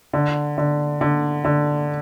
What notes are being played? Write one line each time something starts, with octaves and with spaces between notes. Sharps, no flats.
D3
D3
D3
D3